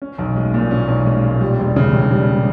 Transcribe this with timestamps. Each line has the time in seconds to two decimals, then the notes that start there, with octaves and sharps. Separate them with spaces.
0.02 C#4
0.19 B1
0.36 G#3
0.54 A#2
0.71 C#4
0.88 B1
1.06 G#3
1.24 A#2
1.41 G3
1.58 E1
1.76 C#3
1.94 D#2
2.12 G3